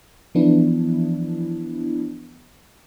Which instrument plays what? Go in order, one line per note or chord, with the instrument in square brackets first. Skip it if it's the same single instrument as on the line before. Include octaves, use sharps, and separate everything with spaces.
[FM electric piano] E3 F3 B3 D4 E4